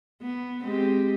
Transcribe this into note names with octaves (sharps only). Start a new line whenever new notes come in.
B3
G#3 C4 G4